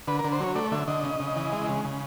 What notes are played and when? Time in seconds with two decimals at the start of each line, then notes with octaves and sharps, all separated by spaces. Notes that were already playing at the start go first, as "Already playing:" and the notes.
0.07 D3 B4
0.19 A#4
0.24 D3
0.32 C5
0.40 F#3 C#5
0.55 A3 D5
0.72 D3 E5
0.87 D3 D#5
1.03 C#3
1.20 C#3
1.36 E3
1.52 G#3
1.69 C#3
1.85 C#3